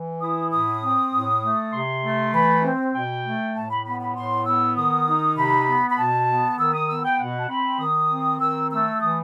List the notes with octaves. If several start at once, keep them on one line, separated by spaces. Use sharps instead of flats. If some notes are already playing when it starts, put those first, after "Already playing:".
Already playing: E3
E4 D#6
A2 D#6
C4
A2
A3
C3 C6
A3
E3 B5
C4
B2 G5
A3
A2 A5
B5
B3 B5
B5
A2 C6
B3 E6
D#3 D#6
D#4
C3 B5
B3
B5
B2 A5
B3
D#3 E6
D#6
B3 E6
G5
B2 F#5
A5
C4 B5
D#3 D#6
C4
D#3 E6
A3 E6
E3 D#6